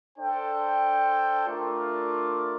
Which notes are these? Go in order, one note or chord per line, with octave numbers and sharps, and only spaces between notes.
D4 A4 C5 G5
A3 D4 F4 A#4 D5